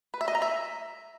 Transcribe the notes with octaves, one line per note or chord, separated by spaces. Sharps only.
B4
E5
D#5
A#5
E5